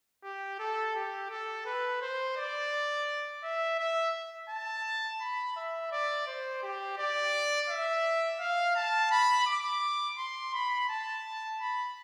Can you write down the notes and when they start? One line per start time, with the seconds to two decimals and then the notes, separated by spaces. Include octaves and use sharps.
0.23 G4
0.59 A4
0.95 G4
1.30 A4
1.65 B4
2.01 C5
2.36 D5
3.43 E5
3.79 E5
4.49 A5
5.21 B5
5.56 E5
5.92 D5
6.27 C5
6.63 G4
6.98 D5
7.69 E5
8.40 F5
8.76 A5
9.11 B5
9.46 D6
10.18 C6
10.53 B5
10.89 A5
11.60 B5